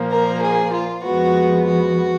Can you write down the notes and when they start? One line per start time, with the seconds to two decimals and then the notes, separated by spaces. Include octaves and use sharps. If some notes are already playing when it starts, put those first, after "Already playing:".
Already playing: A#2 F3 A#3
0.11 A#4
0.42 G#4
0.73 F4
1.04 F2 F3 G#3 B3 F#4
1.67 F#4